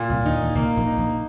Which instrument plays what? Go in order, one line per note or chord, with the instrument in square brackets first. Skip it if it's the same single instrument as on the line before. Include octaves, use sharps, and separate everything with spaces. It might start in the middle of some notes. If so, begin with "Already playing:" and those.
Already playing: [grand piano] A#2
[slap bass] C2 C3
[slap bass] D#2 D#3 [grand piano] D#4
[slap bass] D#2 D#3
[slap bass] C2 C3 [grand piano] A#3
[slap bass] A#1 A#2
[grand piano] D#4
[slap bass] A#1 A#2